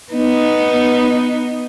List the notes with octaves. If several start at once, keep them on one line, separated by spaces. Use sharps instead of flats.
B3 D#4